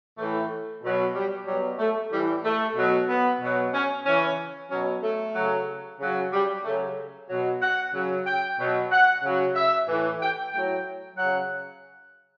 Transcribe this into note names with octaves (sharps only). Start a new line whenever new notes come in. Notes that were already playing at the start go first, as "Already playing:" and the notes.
A2 E3 A3
B2 F#3
G3
B2 F#3 G3
A3
A2 E3 G3
A3
B2 F#3
B3
B2 F#3
C#4
C#3 E3 C#4
B2 F#3 C#4
A3
C#3 F#3
C#3 F#3
G3
C#3 F#3 A3
B2 F#3
F#5
C#3 F#3
G5
B2 F#3
F#5
C#3 F#3
E5
A2 E3
G5
A2 F#3 G5
C#3 F#3 F#5